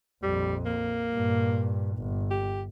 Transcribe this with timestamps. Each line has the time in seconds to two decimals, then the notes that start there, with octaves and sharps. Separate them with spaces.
0.23 A#1 F2 G3
0.66 A#3
1.13 G2 A#2
1.97 G1
2.31 G4